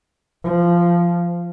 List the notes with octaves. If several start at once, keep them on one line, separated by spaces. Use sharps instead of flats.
F3